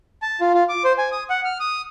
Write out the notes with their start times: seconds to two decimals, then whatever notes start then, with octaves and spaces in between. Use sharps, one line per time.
0.22 A5
0.41 F4
0.54 F4
0.69 D6
0.84 C5
0.98 G#5
1.12 D#6
1.30 F#5
1.45 F6
1.60 D#6